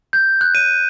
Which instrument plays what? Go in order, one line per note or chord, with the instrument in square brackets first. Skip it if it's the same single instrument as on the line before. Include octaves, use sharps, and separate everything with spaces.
[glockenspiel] G6
F#6
D#7